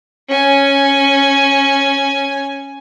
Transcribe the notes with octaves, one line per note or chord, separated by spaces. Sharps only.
C#4 G#5